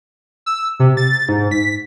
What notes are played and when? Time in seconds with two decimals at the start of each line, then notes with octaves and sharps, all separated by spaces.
0.46 E6
0.80 C3
0.97 A6
1.28 G#2
1.51 B6